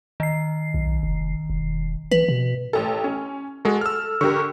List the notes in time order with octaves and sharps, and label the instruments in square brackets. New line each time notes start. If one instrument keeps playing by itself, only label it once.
[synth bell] D#3 C7
[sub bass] B1
F1
E1
[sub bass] E3 [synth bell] B4
[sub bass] B2
[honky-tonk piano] A1 A4
C#4
[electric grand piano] G#3 F#4 [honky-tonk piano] A4
[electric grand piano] E6 F6
[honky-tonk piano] D3 G4 A#4 [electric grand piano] C#6